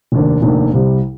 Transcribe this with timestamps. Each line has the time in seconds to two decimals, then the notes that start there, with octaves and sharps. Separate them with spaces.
0.12 F1 D#2 D#3 A#3 D4
0.42 F1 D#2 D#3 A#3 D4
0.74 C2 C3 G3